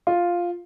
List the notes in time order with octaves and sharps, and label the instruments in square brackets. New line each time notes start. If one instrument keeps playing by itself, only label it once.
[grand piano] F4